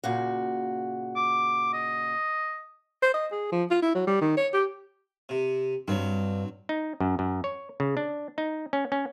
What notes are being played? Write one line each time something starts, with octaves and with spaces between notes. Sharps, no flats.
A#2 C#3 F#4
D6
D#5
C5
D#5
G#4
F3
F4
E4
F#3
G3
D#3
C#5
G4
C3
G2 F#3 C4
D#4
F#2
F#2
C#5
C#3
D4
D#4
C#4
C#4